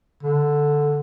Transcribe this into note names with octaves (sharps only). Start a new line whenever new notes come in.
D3